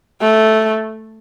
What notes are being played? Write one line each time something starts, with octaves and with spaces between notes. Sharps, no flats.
A3